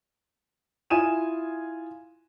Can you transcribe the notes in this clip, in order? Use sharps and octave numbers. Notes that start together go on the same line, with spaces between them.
E4 F4 G#5 D#6 D#7 E7